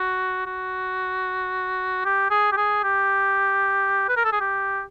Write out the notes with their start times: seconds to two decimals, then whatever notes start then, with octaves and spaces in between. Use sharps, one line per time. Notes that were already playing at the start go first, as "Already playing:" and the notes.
Already playing: F#4
0.46 F#4
2.05 G4
2.30 G#4
2.52 G4
2.57 G#4
2.83 G4
4.09 B4
4.17 A#4
4.24 A4
4.32 G#4
4.40 G4